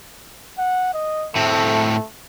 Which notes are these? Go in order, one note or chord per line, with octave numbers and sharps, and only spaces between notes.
F#5
D#5
A2 A3 C4